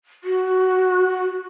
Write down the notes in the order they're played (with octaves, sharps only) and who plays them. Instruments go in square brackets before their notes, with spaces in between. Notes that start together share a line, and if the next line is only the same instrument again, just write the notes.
[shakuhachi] F#4